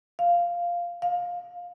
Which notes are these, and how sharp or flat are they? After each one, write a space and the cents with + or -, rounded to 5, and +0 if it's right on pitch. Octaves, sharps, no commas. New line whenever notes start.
F5 -5
F5 +20